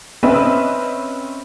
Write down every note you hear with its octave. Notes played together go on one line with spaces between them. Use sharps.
C4 C#4 B4 D#5 E5